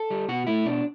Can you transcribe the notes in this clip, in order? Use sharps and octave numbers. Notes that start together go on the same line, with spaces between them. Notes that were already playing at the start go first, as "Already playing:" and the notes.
Already playing: A4
G3
B2 F#4
A3 E4
B2 D4